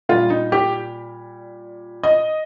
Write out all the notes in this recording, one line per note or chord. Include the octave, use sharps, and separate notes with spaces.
A#2 G3 F4
D#4
G4
D#5